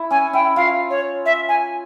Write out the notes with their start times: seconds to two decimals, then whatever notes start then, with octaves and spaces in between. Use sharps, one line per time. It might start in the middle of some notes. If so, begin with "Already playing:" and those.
Already playing: E4
0.11 C#4 G#5
0.33 E4 G5
0.56 F4 F5
0.90 C#5
1.25 E5
1.48 G#5